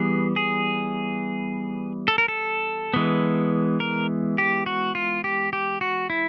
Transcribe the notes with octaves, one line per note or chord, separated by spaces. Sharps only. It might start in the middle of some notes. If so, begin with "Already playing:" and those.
Already playing: E3 G3 B3 G#4
G#4
A4
A#4
A4
E3 G#3 B3
A#4
G4
F#4
F4
G4
G4
F#4
E4